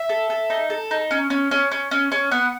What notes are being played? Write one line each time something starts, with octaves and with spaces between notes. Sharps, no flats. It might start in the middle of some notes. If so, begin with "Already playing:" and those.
Already playing: E5
A4
A4
D#4
A4
D#4
C#4
C#4
C#4
C#4
C#4
C#4
B3 F#5